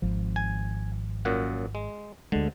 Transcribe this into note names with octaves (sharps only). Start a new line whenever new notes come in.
G#1 F3
G#5
F#2 A#2 F#5
G#3
D2 D3 G#3